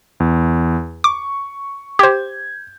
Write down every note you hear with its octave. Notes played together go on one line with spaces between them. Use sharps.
E2
C#6 D6
G4 C5 G6 G#6